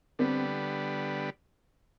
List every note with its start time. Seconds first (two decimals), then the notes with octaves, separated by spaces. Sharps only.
0.19 D3 G3 B3 C4